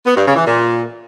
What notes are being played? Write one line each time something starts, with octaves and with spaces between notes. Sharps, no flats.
B3
G2
C#3
E3
A#2